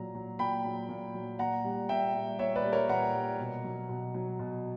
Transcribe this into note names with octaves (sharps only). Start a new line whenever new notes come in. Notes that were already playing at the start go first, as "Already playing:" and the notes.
Already playing: A#2 F#3 A#5
F#3
A#2 G5 B5
F#3
A#2
F#3
A#2 F#5 A#5
G3
A#2 E5 G5
G3
A#2 C#5 E5
B4 D5
G3
A#4 C#5
A#2 F#5 A#5
G3
B2
F#3
B2
F#3
B2